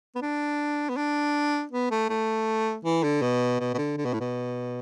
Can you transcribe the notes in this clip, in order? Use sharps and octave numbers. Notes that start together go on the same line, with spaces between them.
B3
D4
B3
D4
B3
A3
A3
E3
D3
B2
B2
B2
D3
D3
B2
A2
B2